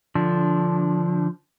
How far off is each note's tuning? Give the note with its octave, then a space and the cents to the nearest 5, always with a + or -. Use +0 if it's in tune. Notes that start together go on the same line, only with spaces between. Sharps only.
D3 +0 F3 +0 D4 -15